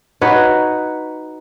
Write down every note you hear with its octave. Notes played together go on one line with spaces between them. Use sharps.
D#4 F#4 B4 C#5